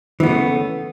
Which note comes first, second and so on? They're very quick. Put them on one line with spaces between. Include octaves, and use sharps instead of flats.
E3 B3 A3 C#3